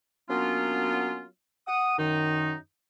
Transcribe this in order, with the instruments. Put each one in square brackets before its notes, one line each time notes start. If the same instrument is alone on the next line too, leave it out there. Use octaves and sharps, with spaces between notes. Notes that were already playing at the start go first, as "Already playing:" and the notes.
[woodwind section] F#3 A#3 B3 C#4 D4 F4
F#5 D#6
F#2 D#3 D#4